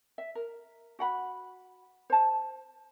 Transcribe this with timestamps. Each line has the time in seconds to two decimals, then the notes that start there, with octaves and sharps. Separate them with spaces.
0.18 E5
0.35 A#4
0.99 F#4 F#5 B5
2.10 C5 A5